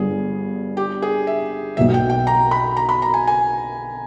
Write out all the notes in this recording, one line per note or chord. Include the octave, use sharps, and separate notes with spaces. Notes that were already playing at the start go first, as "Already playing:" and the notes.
Already playing: G1 G2 G3 B3 G#4
G4
G#4
E5
B1 B2 A#3 E5
G5
G5
A#5
B5
A#5
B5
A#5
G#5
G#5